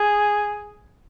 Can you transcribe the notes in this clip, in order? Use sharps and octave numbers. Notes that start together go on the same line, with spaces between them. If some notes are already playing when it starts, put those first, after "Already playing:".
Already playing: G#4